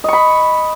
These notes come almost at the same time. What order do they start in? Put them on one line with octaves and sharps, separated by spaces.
D#5 C#6 B5